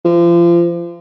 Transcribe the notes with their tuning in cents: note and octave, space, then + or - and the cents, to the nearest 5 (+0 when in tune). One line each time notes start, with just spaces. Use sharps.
F3 -30